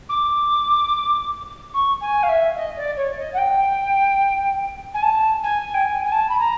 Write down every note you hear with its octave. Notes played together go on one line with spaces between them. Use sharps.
D6
C#6
G#5
F5
E5
D#5
D5
C#5
D#5
F#5
G5
G#5
A5
G#5
G5
G#5
G#5
A5
B5
A#5